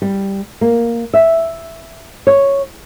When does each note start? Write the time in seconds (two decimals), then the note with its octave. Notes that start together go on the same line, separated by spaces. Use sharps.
0.02 G3
0.61 A#3
1.14 E5
2.27 C#5